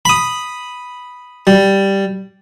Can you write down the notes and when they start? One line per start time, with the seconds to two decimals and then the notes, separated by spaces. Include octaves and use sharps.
0.05 B5 D#6
1.47 G3